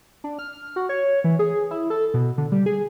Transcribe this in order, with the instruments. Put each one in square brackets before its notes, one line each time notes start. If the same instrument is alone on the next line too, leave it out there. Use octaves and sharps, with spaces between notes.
[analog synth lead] D4
F6
F#4
C#5
E3
G#4
E4
A4
B2
D3
G3
G#4